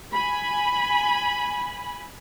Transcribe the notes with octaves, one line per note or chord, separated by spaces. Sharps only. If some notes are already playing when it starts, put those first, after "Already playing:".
G#5 B5